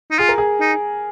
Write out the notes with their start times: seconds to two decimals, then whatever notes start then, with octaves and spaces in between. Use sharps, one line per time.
0.11 D#4
0.19 F4 G#4
0.29 A#4
0.38 G#4
0.60 D#4